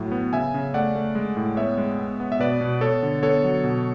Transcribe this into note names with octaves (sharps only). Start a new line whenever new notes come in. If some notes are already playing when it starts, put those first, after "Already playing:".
Already playing: A2 F#3
B3
C#3 E5 G#5
C#3
A3 D5 F#5
A3
G#3
A2
B3 C#5 E5
G#3
B3
B3
E5
B2 B4 D5
B2
B3 A4 C#5
D3
B3 A4 C#5
F#3
B2